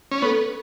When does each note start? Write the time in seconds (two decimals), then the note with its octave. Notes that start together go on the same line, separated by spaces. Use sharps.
0.12 C#4
0.22 B3 A4